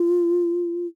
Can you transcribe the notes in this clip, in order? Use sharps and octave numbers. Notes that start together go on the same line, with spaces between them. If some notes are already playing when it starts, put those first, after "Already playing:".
Already playing: F4